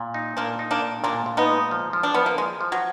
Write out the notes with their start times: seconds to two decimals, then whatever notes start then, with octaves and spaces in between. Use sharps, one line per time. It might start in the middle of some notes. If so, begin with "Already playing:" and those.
Already playing: A#2
0.14 D#4
0.37 A#2 A#3 D4
0.59 D#4
0.71 A#3 D4
0.82 A#2
1.04 A#2 A#3 D4
1.26 A#2
1.37 B3 D#4
1.49 G#3
1.71 F3
1.93 F3
2.03 D4
2.14 F3 B3
2.26 A#3
2.38 F3 G#3
2.61 F3
2.72 F#3